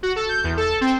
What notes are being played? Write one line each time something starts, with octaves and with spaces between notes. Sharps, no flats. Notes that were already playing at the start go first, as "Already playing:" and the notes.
F#4
A4
G6
E2
A4
C4